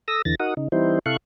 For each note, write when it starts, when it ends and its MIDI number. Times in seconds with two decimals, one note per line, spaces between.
0.08 0.22 69
0.08 0.22 87
0.08 0.22 88
0.08 0.22 94
0.25 0.35 40
0.25 0.35 50
0.25 0.35 52
0.25 0.35 93
0.25 0.35 94
0.40 0.54 63
0.40 0.54 66
0.40 0.54 70
0.40 0.54 78
0.40 0.54 87
0.57 0.68 49
0.57 0.68 63
0.72 0.99 52
0.72 0.99 55
0.72 0.99 60
0.72 0.99 63
0.72 0.99 64
0.72 0.99 72
1.06 1.17 48
1.06 1.17 64
1.06 1.17 69
1.06 1.17 77
1.06 1.17 85
1.06 1.17 90